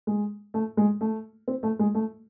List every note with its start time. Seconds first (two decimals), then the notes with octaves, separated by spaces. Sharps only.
0.07 G#3
0.54 A3
0.77 G#3
1.01 A3
1.48 C4
1.63 A3
1.79 G#3
1.94 A3